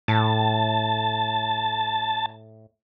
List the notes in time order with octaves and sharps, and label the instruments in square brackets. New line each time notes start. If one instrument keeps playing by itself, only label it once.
[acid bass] A2 [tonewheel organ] A5